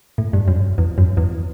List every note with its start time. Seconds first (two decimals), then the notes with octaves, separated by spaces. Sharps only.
0.18 A2
0.33 G2
0.48 F#2
0.78 E2
0.98 F#2
1.17 E2